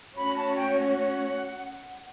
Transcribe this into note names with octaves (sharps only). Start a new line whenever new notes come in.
A3 C#4 F#4 C#5 B5
A5
G5
F#5